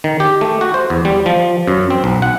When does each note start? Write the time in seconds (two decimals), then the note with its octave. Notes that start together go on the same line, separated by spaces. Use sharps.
0.04 D#3
0.20 G4
0.41 A3
0.61 F#4
0.74 C5
0.90 E2
1.05 G3
1.26 F3
1.67 F#2
1.90 C4
2.04 B1
2.22 F#5